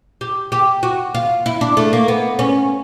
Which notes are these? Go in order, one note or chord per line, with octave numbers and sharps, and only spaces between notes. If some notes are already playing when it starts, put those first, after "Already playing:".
G4
G4
F#4
F4
E4
D4
A3
A#3
B3
C#4